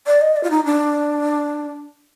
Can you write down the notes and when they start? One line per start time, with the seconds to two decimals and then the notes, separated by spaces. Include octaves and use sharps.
0.07 D5
0.21 D#5
0.36 D5
0.43 F4
0.51 D#4
0.65 D4